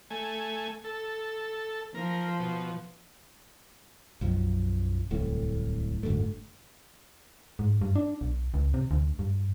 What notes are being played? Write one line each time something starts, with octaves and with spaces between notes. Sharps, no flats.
A3 G#5
A4
F3 A#4
B2
B1 F#2 F3
D1 C2 A2 A3
F#1 D2 G#2 A3
G#2
G2
D4
B1
C#2
C3
D2
G2